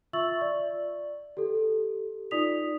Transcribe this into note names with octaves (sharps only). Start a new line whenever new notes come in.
F4 E5 C#6 E6 A6 F#7
D5
G4 A4
D#4 F4 D5 D#6 B6 F7